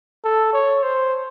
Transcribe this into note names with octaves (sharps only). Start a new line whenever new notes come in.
A4
C#5
C5